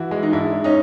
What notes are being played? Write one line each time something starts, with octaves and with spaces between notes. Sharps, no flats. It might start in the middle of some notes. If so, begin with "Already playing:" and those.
Already playing: E3 E4 F#4
G#3
D#4
G#2 D4 E4
G#3
C#4 D#4